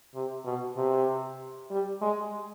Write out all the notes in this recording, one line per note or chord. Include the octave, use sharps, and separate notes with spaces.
C3
B2
C3
G3
G#3